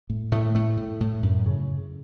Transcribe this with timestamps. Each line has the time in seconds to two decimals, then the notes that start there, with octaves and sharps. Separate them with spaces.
0.10 A2
0.32 A2 A3
0.55 A2 A3
0.77 A2
1.00 A2
1.23 F#2
1.46 C#3